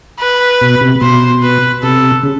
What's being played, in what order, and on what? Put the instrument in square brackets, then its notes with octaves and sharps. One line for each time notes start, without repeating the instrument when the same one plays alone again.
[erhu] B4
[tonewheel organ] B2
C3
[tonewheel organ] B2 [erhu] C5
[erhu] B4
[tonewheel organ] C3 [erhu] A4
[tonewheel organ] C#3